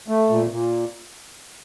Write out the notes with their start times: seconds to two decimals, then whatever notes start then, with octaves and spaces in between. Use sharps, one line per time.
0.08 A3
0.29 A#2
0.50 A#2